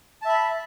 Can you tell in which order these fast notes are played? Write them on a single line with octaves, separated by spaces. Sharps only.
A5 E5 B5